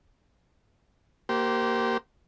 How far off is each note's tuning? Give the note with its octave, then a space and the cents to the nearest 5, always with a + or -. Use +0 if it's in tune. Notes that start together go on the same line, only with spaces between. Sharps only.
A#3 +0 G4 -25 C5 +0